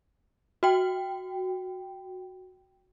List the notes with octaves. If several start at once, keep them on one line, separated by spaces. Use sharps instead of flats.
F#4 G5